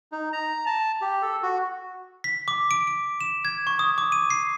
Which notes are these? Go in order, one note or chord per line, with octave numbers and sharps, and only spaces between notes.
D#4
A#5
A5
G4
A4
F#4
B6
D6
D7
D7
E7
G#6
C#6
D#6
D6
D#7
C7